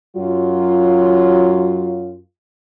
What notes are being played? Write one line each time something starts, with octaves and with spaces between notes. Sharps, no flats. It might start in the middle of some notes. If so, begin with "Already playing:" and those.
F#2 F#3 F4